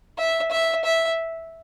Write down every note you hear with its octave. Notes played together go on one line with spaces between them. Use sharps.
E5
E5
E5